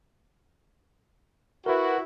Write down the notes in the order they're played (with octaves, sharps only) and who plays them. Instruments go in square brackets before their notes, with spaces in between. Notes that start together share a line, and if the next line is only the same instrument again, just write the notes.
[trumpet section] E4 F#4 [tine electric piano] A#4 B4